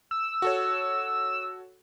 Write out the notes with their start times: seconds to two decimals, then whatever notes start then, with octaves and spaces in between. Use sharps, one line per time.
0.11 E6
0.42 F#4 A4 C#5